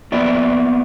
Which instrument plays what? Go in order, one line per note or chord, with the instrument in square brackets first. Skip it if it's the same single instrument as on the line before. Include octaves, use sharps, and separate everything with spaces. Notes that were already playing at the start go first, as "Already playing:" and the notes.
[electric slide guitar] A#3 B3 D5 E5 G5